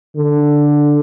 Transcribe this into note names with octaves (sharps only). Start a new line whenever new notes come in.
D3